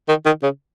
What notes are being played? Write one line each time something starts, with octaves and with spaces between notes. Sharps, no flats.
D#3
D#3
C#3